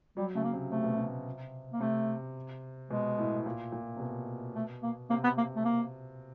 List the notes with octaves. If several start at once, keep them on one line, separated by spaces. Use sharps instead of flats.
F#3 G3
C#3 A3
A#3
C3
C3 A3
B2
C3
A#3
C3 A3
B2 G#3
A2
A#2
A#2
C3
B2
A3
A#3
C3 A#3
B3
A#3
A3
A#3